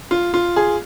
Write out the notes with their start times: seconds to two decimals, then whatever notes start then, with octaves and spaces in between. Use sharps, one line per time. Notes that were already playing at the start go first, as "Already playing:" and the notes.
0.11 F4
0.34 F4
0.56 G#4